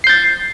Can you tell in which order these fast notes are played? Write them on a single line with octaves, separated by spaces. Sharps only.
C7 G6 A6